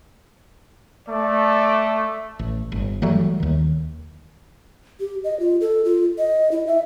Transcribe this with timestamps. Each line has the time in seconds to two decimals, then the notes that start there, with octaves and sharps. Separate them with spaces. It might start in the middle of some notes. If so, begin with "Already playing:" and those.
1.08 A3 D5
2.39 A1
2.72 G1
3.02 E3 F#3 G3 A3
3.40 D#2 D#3
5.00 G4
5.24 D#5
5.40 F4
5.61 A4
5.85 F4
6.18 D#5
6.52 E4
6.67 E5